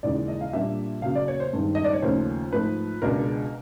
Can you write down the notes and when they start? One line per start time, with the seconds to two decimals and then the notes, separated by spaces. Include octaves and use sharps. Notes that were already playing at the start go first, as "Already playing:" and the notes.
0.03 D#2 C#3 E3 G#3 D5
0.28 D#5
0.41 F5
0.53 A#2 G3 A#3 D4 E5
1.02 C#3 F#3 A#3 F5
1.15 D5
1.28 C#5
1.40 C5
1.53 G2 D#3 G#3
1.75 D#5
1.84 D5
1.93 C#5
2.02 D#2 C#3 F3 A3 C#4 C5
2.53 G#2 F3 A3 B4
3.02 C#2 B2 G#3 B3 D4 A#4